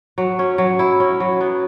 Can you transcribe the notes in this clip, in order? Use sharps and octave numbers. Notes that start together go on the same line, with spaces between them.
F#3
C#4
F#3
E4
C#4
F#3
B3